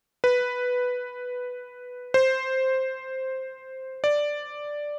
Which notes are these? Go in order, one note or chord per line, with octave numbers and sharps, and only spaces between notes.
B4
C5
D5